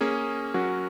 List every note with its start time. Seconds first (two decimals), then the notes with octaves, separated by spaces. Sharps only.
0.01 A#3 C#4 G#4
0.54 F#3 C#4 F#4 A#4